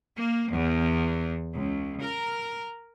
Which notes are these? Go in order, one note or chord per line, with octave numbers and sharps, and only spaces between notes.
A#3
E2
C#2
A#4